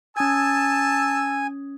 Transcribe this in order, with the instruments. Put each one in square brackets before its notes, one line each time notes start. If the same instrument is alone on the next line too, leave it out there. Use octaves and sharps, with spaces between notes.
[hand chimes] C#4 D#6 G#6 [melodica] G#5 [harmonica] A5 E6